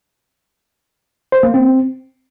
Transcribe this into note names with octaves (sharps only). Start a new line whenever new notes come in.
C5
A#3
C4